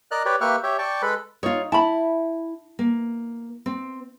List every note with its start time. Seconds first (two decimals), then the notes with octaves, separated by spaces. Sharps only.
0.11 A#4 D5 D#5 F6 F#6
0.25 G4 B4 C#5 D5
0.41 A#3 G4 B4 E5 C#6 F6
0.63 G4 C#5 E5
0.78 D5 G5 A5 C#6
1.02 G#3 A4 B4 B5
1.43 D#4 F4 C#5
1.72 E4 A5 B5
2.79 A#3
3.66 C4